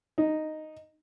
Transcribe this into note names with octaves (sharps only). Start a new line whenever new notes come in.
D#4